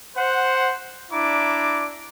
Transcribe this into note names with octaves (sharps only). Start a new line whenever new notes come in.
C5 F#5
D4 E4 A#5 D6